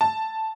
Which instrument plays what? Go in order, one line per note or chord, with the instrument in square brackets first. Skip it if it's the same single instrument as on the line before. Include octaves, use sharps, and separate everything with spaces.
[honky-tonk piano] A5